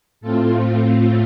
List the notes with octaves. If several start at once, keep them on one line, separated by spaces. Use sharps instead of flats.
A2 A3 C4 F4 A4